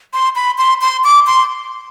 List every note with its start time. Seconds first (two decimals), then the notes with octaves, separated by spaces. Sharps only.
0.13 C6
0.35 B5
0.58 C6
0.81 C6
1.04 D6
1.27 C6